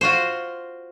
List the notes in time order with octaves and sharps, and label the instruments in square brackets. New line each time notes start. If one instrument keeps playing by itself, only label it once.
[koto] F4 F#4 C5